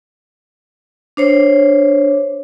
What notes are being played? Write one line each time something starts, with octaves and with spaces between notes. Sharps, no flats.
D4 C5 C#5